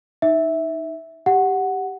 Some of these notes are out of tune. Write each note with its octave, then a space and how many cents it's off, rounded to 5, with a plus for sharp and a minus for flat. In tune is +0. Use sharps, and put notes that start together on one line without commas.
D#4 +0 E5 -10
G4 +0 F#5 +0